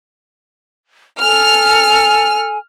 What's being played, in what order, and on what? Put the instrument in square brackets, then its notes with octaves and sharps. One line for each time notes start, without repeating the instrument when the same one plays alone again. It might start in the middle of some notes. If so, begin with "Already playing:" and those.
[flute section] A4 G#5 [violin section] F6